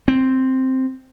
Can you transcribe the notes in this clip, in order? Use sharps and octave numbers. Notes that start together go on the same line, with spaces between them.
C4